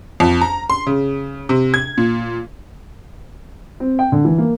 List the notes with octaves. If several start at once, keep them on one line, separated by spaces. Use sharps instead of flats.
F2
A#5
C6
C#3
C3
G#6
A#2
C4
G5
D3
E3
A#3